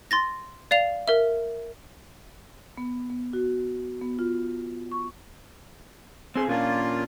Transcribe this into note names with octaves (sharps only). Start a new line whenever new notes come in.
C6 A6 A#6
D5 F5 F7
A#4 E5
B3
B3
F#4
B3
F4
C#6
C4 G#4 C6
A#2 A#3 C#4 D4 F4